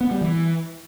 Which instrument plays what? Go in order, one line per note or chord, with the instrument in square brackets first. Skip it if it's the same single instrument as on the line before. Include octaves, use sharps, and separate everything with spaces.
[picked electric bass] B3
G3
E3